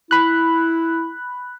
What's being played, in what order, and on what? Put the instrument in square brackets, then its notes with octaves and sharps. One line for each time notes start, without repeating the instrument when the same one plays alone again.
[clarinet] E4 [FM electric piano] B5 F#6